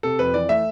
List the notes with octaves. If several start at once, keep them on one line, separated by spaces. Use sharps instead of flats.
C3 A4
F2 B4
E3 D5
A3 E5